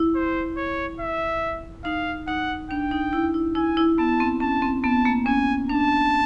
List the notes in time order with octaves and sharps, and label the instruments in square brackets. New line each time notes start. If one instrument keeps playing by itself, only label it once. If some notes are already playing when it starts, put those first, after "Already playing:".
Already playing: [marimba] E4
[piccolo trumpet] C5
C#5
E5
[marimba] D#4 [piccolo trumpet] F5
[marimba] D#4 [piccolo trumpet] F#5
[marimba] D4 [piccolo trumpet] G5
[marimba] D#4
E4
E4
[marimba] E4 [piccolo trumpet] G#5
[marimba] E4
[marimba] B3 [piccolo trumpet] A5
[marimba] C4
[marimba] C#4 [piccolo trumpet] A5
[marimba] C4
[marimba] B3 [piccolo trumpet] A5
[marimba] A#3
[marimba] C#4 [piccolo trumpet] G#5
[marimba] D4 [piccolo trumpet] A5